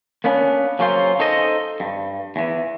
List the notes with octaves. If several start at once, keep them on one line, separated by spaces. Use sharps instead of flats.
A#3 B3 C#4 D4
C#3 F#3 A#3 C#4 F4 C5
D#4 A4 C5 D#5
G2
E2 E3